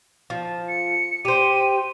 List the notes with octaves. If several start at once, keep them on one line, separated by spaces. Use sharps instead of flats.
F3
C#7
G4 C5 D#7